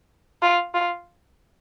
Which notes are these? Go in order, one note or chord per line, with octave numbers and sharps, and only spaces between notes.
F4
F4